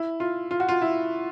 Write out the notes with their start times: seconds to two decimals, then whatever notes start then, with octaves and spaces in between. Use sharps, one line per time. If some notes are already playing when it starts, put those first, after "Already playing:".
Already playing: E4
0.20 F4
0.51 F4
0.60 F#4
0.69 F4
0.82 E4